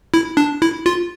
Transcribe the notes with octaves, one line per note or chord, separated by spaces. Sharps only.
E4
D4
E4
F4